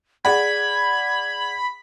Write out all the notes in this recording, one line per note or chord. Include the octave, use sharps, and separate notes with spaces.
G#4 D5 F#5 B5 G#6